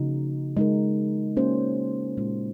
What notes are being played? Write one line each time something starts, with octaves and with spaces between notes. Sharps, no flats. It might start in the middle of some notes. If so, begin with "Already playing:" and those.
Already playing: C#3 F3 A#3 D#4 F#4
G#3 D#4 A#4
A#3 C#4 F#4 C5
A#2 G#3 C#4 F4